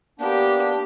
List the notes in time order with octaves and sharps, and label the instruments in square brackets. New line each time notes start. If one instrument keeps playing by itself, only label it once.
[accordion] A#3 B3 D4 [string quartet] G4